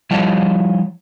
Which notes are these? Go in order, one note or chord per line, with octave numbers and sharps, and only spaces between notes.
F3 G3 E4 C#5 D#5 A5